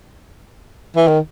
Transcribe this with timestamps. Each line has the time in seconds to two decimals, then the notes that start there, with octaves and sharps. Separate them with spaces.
0.96 E3
1.07 D#3